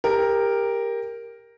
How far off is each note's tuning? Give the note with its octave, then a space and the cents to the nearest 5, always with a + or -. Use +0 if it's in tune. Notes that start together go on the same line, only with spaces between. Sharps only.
G4 +20 A#4 +0